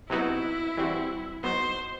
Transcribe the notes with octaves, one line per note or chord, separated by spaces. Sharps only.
C3 F#3 B3 D#4 E4 F#4
E3 G3 C4 F#4
F#3 B3 D#4 F#4 C5